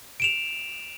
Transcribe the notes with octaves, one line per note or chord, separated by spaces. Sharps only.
D7 E7 F7